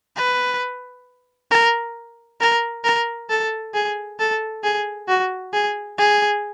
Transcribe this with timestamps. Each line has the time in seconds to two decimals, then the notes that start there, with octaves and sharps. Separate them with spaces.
0.17 B4
1.51 A#4
2.41 A#4
2.84 A#4
3.30 A4
3.74 G#4
4.20 A4
4.63 G#4
5.08 F#4
5.53 G#4
5.98 G#4